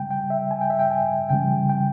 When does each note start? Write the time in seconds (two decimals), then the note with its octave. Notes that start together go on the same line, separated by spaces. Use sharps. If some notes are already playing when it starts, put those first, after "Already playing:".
Already playing: C#3 G3 G5
0.11 G5
0.30 E5
0.51 G#5
0.61 G5
0.70 E5
0.79 G5
0.91 G#5
1.29 C#3 E3 G3 G5
1.69 G5